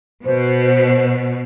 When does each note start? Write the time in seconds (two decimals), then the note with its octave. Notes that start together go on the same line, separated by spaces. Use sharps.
0.25 B2 C5